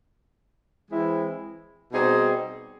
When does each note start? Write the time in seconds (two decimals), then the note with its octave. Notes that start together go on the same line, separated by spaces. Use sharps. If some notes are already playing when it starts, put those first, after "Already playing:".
0.89 E3 G#3 C4 E4
1.92 B2 G3 C4 D#4 G#4